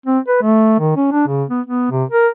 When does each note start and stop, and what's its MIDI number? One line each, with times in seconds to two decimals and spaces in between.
0.06 0.19 60
0.27 0.37 71
0.42 0.77 57
0.79 0.93 51
0.96 1.11 61
1.12 1.27 62
1.27 1.44 49
1.49 1.61 59
1.66 1.88 59
1.91 2.04 48
2.09 2.28 70